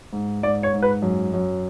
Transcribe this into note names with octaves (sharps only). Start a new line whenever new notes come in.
G#2
G#2 D5
C#5
G#2
B4
F#2
F#2